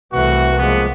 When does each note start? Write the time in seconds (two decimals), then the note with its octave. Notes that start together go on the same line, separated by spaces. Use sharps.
0.13 C2 E3 A3 F#4 B4
0.58 F3 G#3 A#3 B3